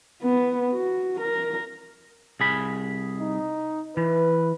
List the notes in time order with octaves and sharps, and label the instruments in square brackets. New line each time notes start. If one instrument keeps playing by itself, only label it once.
[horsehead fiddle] B3
F#4
A#4
[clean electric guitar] C2 G#4 B5
[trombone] D#4
[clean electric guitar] E3 [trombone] B4